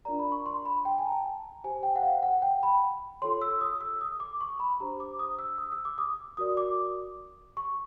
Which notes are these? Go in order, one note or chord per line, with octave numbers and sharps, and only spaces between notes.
D4 F4 A#4 D5 A#5
B5
C#6
C6
B5
G5
G#5
A#5
A5
G4 C5 G#5
G5
F#5
F5
F#5
G5
B5
F4 A4 C#5 C6
E6
D#6
E6
D#6
D6
C#6
B5
D4 G4 C5 A#5
D6
D#6
E6
D#6
E6
D6
D#6
F#4 A#4 D5 D#6
D6
C#6